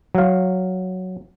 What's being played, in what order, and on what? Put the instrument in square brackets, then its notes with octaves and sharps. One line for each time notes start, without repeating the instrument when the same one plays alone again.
[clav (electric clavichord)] F#3 F5